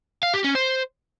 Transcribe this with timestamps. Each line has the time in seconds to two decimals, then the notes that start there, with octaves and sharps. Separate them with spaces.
0.23 F5
0.34 G4
0.44 C#4
0.55 C5